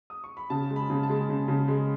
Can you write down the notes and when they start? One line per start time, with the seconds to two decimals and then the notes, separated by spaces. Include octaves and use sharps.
0.10 D#6
0.24 C#6
0.37 B5
0.50 C#3 A5
0.70 G#3
0.76 B5
0.90 C#3
1.03 A5
1.09 G#3
1.29 C#3
1.48 C#3
1.68 G#3